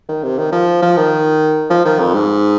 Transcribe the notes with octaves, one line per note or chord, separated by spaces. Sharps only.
D#3
C3
D#3
F3
F3
D#3
F3
D#3
F2
G#2